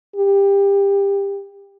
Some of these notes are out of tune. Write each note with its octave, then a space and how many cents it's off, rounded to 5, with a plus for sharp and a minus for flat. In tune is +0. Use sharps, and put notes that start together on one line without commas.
G4 +20